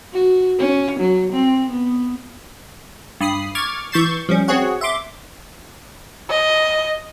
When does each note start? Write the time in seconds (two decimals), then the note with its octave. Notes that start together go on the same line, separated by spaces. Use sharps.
0.13 F#4
0.59 C#4
0.99 F#3
1.33 C4
1.70 B3
3.21 G2 B5 D#6 C7
3.55 C#6 D6 F6 G#6 A6
3.92 E3 C#6 G6 A6 C7 E7
4.29 F3 G3 C#4
4.48 C4 F#4 G#4 C#5 F#5
4.81 E5 C6 D6
6.30 D#5